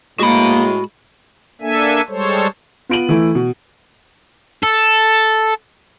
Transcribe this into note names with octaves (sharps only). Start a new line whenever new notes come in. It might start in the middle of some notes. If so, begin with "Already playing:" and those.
A2 G#3 A#3 F#4 B5
A#3 D4 A4 E5 G#5
G3 G#3 A4 C5 C#5
B3 F4 D7 D#7 F#7
E3 A3 E4
B2
A4